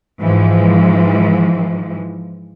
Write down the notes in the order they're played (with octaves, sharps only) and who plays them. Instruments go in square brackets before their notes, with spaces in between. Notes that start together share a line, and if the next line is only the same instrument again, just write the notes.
[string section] G#2 E3 F3